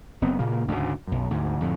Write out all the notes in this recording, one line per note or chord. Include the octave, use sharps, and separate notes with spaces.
F#1 B3 C4
A#2 C#3 A#3
D2 G#2 C#3
B1 F#2
D2 G#2
F2 A2 D3